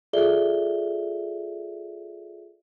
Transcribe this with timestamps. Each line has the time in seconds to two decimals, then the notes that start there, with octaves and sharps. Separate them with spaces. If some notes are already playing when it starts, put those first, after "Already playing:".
0.13 F4 G#4 A4 D5 E5 G7